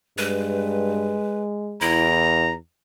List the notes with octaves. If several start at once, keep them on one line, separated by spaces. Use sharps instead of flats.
G2 G#3 B4
E2 E4 A#5